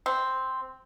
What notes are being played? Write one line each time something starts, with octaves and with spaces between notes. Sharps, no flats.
C4